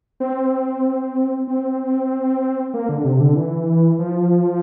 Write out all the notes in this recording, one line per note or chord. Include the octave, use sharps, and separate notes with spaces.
C4
C4
A#3
D3
C3
D3
E3
F3